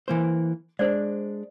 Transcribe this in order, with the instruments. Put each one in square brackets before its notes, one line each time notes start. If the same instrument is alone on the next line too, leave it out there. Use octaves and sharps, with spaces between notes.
[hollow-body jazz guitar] E3 A#3 C5
[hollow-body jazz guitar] G#3 D4 [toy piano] C5 D5